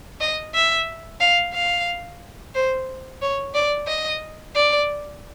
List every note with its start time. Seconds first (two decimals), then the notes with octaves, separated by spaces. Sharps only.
0.21 D#5
0.54 E5
1.20 F5
1.54 F5
2.55 C5
3.22 C#5
3.55 D5
3.88 D#5
4.56 D5